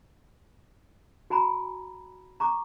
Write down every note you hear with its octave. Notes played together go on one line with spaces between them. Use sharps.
F#4 G#5 A#5 B5
A#5 C#6 D6